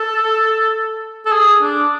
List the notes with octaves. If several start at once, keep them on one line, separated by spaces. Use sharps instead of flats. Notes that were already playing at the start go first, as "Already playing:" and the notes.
Already playing: A4
A4
G#4
D4